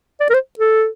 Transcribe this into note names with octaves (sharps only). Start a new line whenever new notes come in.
D5
A#4
C5
A4